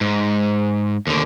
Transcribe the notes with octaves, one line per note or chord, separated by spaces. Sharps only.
G#2
D#2 D3